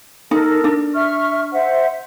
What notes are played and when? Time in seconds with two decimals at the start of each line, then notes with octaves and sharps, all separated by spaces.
0.31 D#4 A4 A#4
0.64 D4
0.95 E5 C#6 F6
1.52 C5 E5 F#5